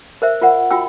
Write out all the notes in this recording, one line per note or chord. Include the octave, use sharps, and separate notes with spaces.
A#4 C5 E5
F4 A#4 F#5
F4 F#4 G5 E6